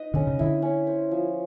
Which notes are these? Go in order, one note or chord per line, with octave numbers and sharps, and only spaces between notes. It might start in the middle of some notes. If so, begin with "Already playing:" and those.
Already playing: D#4 B4 D#5
D3 C#4
C#3
D3 E4
C#4
C5
F3